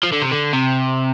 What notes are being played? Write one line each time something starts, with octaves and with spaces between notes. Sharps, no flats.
F3
D3
C3
D3
C3